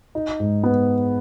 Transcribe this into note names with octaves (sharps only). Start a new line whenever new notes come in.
D#4
G#2
B3